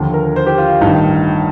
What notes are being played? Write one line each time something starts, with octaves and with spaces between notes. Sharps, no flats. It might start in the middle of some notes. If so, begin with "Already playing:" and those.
Already playing: D#2 D3 F3
A#4
C5
G4
F4
A1 G2 D#3 D#4